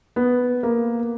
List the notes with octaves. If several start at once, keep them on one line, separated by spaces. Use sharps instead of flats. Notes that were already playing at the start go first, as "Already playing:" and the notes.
B3
A#3